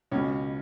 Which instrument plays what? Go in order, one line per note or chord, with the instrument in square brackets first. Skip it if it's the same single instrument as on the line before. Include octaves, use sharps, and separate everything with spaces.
[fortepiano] C#2 B2 C#4